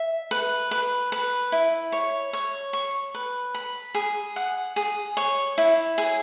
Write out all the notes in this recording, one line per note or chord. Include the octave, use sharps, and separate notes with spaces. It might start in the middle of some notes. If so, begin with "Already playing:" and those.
Already playing: E5
B4
B4
B4
E4
C#5
C#5
C#6
B4
B5
G#4
F#5
G#4
C#5
E4
G#4